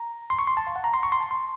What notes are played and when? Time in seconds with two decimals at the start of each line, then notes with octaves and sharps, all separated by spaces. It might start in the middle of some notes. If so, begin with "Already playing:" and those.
Already playing: A#5
0.30 C6
0.39 C#6
0.47 C6
0.57 A5
0.67 F5
0.76 F#5
0.84 A#5
0.94 C6
1.03 C#6
1.12 C6
1.20 A5
1.31 C6